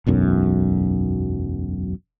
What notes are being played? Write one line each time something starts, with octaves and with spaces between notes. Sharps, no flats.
E1 B1 F#2